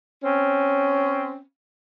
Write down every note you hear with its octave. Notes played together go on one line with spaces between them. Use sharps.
C4 C#4